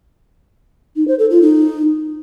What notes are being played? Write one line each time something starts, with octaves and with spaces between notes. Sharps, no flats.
D#4
C5
A4
F4
D#4